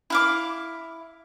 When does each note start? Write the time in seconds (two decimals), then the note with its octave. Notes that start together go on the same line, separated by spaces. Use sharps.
0.10 E4 F5 D6